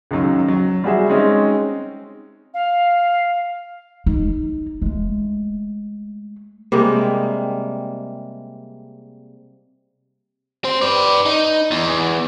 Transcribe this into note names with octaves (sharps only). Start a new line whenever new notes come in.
C#2 F#2 D#3 F#3
F#3
G3 F#4 G#4 E5
G#3 C4 C#4 D#4
F5
D#4
G#3 A3
C3 G3 G#3 A#3
C4 C5
B4 D5
D#4
E2